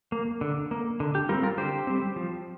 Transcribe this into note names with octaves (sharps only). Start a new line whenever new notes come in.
A#3
D3
A#3
D3
G4
G3 C4 F4 A#4
F4 A#4
D3 G4 C5
G3 C4
F3